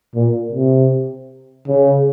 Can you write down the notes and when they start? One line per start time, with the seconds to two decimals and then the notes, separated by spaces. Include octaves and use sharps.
0.15 A#2
0.53 C3
1.68 C#3